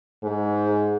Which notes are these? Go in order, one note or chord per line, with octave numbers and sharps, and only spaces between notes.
G#2